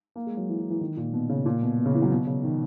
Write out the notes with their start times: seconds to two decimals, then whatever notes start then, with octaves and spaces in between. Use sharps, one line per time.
0.16 A#3
0.27 G#3
0.37 F#3
0.49 E3
0.59 F#3
0.70 E3
0.81 D#3
0.97 A#2
1.13 B2
1.29 C#3
1.46 A#2
1.62 B2
1.78 B2
1.86 C#3
1.94 E3
2.02 F#3
2.11 B2
2.27 C#3
2.43 D#3